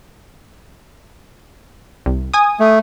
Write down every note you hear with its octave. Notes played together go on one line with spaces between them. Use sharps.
C2
G#5 D#6
A3